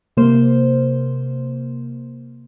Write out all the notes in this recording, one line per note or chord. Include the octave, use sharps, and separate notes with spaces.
C3 A#3 C5